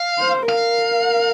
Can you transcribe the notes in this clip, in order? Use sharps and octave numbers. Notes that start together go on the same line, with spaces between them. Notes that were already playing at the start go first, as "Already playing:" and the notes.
Already playing: F5
C5
A#4 F5